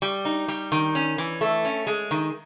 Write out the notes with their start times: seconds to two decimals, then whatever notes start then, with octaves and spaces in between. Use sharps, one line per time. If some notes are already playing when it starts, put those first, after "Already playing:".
0.02 G3
0.25 D#4
0.48 G3
0.72 D#3
0.95 C#4
1.18 E3
1.41 A3
1.65 C#4
1.87 G#3
2.11 D#3